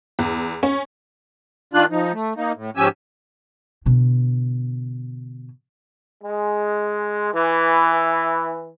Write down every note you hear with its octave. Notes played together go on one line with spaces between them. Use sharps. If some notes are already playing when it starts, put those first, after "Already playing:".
E2
C#4
D#3 D4 F4 F#6
F3 D#4
A3
A#3 D#4
A2
G#2 F3 C#4 G4 G#5 E6
B2 D3
G#3
E3